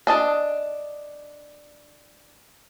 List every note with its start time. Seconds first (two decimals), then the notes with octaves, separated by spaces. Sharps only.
0.07 D4 D#5 A5